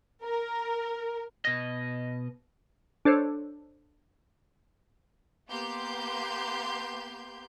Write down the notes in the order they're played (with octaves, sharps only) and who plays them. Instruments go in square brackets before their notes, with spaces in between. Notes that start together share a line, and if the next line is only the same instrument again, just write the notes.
[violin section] A#4
[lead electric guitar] B2 D#5
[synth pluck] D4 A4 C5 C#5
[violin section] A#3 B3 G4 C6 G6